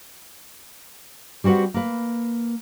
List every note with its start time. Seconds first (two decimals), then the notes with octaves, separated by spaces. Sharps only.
1.44 G3 C4 F#4 B4 F#5
1.74 A#3 B4